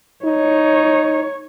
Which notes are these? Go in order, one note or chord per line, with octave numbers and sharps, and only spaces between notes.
D#4 C#5